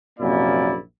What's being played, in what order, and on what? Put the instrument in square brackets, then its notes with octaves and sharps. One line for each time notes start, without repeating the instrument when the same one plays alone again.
[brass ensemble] A#1 F#2 C3 A#3 E4 D5